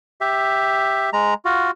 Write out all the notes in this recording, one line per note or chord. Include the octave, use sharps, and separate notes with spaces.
G4 E5
G#3 A#5
F4 F#4